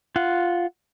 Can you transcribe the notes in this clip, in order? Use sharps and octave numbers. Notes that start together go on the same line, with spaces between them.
F4 F#5